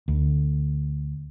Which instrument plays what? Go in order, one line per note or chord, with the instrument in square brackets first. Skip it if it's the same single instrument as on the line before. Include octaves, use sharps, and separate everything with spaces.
[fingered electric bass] D2